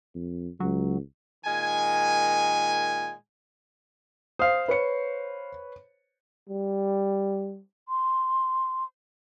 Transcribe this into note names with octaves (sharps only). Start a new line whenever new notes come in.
F2
C#2 F#3
A#2 D#3 G#3 G#5
C5 F5 D#6
B4 C#5 C#7
G3
C6